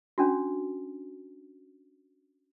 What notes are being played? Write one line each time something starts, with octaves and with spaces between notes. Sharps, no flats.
C#4 D4 F#4